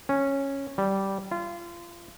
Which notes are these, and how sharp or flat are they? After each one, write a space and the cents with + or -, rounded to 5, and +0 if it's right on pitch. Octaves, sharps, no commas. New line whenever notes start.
C#4 -10
G3 -10
F4 -25